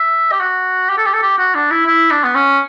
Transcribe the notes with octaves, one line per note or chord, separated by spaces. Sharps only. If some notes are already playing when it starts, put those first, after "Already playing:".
Already playing: E5
G4
F#4
G4
A4
G4
A4
G4
F#4
D4
E4
E4
D4
B3
C#4